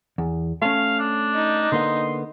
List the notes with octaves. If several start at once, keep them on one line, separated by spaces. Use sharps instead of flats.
E2
A3 C#4 F5
D4
D#4
D3 A#3 B3 C6